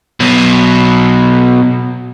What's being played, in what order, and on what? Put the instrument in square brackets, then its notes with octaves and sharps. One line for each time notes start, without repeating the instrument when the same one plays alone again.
[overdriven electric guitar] B2 F#3